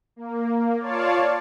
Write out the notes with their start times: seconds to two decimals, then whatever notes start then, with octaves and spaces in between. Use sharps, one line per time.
0.16 A#3
0.79 F4 C#5 D5 F5 A5